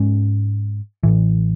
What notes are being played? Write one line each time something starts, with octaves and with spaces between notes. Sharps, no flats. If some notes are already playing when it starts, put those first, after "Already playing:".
Already playing: G#2 G#3 C#4
A1 A2 E3